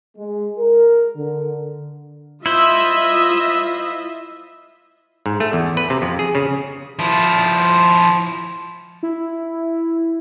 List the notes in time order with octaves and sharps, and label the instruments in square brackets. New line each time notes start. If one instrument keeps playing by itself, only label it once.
[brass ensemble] G#3
A#4
D3
[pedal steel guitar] E4 C5 [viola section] F4 D#5 E5
[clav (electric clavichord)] G#2
A3
E2
B4
C3
F2
G#4
C#3
[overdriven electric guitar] F3 E4
[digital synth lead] E4